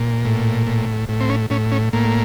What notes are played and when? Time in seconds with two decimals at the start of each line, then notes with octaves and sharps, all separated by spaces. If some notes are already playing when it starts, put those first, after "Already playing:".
Already playing: A#2
0.25 A2
0.67 A2
1.09 A2
1.20 C4
1.29 C#4
1.50 A2 C#4
1.72 C#4
1.93 A2 A#3